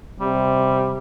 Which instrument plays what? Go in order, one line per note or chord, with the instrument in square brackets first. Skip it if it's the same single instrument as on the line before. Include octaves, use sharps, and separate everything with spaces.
[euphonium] C3 [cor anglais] G3